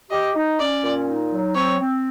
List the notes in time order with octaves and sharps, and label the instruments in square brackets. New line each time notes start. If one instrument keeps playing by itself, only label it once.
[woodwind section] G4 [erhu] D#5
[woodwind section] D#4
[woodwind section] C#4 [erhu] D5
[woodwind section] A#2
D#4
F#3
[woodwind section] C4 [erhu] C#5
[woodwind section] C4